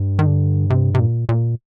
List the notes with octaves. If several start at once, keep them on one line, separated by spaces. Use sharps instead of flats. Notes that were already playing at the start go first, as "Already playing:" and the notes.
Already playing: G2
D#3
D3
C3
C3
A#2
A#2